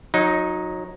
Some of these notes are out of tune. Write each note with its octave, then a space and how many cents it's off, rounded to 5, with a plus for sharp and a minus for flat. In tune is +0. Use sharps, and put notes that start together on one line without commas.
F#3 -25 D#4 +0